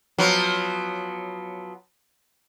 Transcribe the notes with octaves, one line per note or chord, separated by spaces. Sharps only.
F3 F#3 B3